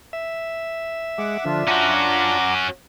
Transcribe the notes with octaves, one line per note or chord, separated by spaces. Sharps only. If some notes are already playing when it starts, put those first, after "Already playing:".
E5
G#3 F#5 D6
D3 F3 D4 F4
C#4 F#4 F#5 A#5 D6